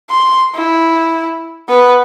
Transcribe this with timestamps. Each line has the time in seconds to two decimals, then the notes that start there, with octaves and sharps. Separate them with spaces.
0.10 C6
0.55 E4
1.69 B3 B4